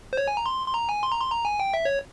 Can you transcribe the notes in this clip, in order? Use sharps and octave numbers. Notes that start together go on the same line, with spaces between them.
C5
C#5
G#5
A#5
C6
C6
A#5
G#5
C6
A#5
C6
A#5
G#5
G5
E5
C#5